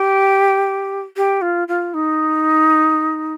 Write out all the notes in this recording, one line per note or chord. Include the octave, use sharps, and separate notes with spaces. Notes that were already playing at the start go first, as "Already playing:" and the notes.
Already playing: G4
G4
F4
F4
D#4